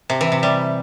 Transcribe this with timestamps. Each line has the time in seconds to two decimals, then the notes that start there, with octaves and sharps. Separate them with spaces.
0.10 C3
0.21 E3
0.32 C3
0.43 G3